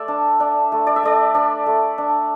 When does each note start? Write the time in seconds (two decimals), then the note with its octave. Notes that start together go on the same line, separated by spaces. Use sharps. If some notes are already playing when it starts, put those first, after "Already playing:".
Already playing: A3 D5 E5
0.08 D4
0.40 D4
0.72 A3
0.87 D5
0.96 E5
1.03 A3 D5
1.34 D4 D5
1.66 A3
1.98 D4